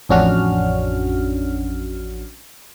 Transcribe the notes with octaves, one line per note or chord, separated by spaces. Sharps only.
A1 F2 C#4 D4 F#4 F6